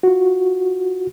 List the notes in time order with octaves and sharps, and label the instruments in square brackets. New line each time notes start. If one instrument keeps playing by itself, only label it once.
[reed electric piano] F4 F#4